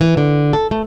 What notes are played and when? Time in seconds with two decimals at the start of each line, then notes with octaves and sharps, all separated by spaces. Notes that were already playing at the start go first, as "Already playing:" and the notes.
0.01 E3
0.17 D3
0.53 A4
0.71 A3